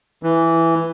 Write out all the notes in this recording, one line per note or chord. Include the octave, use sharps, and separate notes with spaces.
E3